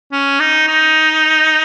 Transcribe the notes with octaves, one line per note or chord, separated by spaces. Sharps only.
C#4
D#4
D#4